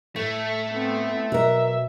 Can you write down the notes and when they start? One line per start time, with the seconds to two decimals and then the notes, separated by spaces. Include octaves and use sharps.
0.16 A2 A3
0.72 B3 C4
1.32 B2 F#3 A#4 E5